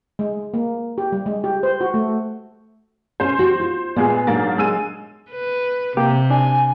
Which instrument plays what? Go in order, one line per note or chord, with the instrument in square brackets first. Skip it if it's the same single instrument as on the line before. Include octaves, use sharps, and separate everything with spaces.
[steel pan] G#3
A#3
G4
G3
G#3
G4
C5
F#4
A3
[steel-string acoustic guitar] B2 C#4 G#5 [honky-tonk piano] C5
[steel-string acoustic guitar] G3 F#4
F4
[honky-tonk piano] A#2 G#3 G#4 [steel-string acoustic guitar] B3
[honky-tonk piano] G#2 A#3 A6 [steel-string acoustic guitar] F#3 D4
[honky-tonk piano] G#3 E6 D#7
[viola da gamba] B4
[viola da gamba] C3 [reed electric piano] A#3 G4
[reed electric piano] D4 [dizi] G#5